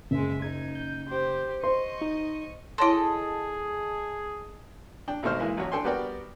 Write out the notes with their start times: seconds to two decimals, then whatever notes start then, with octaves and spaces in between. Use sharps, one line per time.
0.11 F#1 G#3 E5
0.42 D#4 G#6
0.75 G6
1.09 G4 C5
1.64 C5 D#5 C6 C#6
2.01 D#4
2.78 E4 G#4 A4 C#5 D#5 C6
5.08 D4 G5
5.23 G#1 B2 A3 D#4 C5 F6
5.39 E3 G#3 A#3 E4
5.57 A1 F#3 F#4 C#5
5.72 D4 A4 G5 G#5 C6
5.84 G3 B3 F#4 A#4 D5 G5